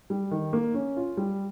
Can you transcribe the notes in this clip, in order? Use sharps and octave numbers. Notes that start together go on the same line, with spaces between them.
G3
D#3
A#3
C#4
F4
G3